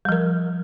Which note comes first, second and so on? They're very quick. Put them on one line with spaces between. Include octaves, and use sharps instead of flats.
G3 F3 A#4